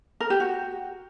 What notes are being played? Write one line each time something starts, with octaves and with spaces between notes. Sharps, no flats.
A#4
G4
F#4